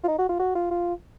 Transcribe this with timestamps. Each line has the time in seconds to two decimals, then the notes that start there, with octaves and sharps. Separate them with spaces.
0.04 F4
0.08 D#4
0.18 F#4
0.29 F4
0.39 F#4
0.55 F4
0.71 F4